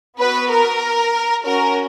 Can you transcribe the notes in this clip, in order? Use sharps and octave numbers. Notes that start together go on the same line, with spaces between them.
B3 F#4 B4
A#4
C#4 F#4 A#4